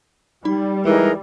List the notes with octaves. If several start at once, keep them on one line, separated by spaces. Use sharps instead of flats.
G3 D#4 B5
E3 G#3 D#4 G#4 A#4